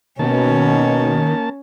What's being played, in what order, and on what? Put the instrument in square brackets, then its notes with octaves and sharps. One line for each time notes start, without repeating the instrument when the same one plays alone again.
[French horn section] B2 [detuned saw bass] D#3 [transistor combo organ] A#3 A5 [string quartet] C#4